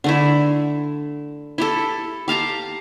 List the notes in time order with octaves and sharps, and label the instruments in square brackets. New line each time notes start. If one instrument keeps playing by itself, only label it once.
[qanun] D3 A3 E4
E4 G4 A4
G4 F5 A5 A#5